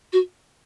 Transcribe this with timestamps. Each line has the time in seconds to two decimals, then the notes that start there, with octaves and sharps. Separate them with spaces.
0.13 F#4